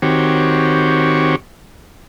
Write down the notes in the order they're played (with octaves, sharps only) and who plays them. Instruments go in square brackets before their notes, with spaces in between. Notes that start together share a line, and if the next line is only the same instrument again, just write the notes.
[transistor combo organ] D#3 C4 F#4 G4 C#5